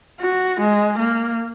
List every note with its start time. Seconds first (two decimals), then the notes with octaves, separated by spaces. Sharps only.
0.20 F#4
0.60 G#3
0.99 A#3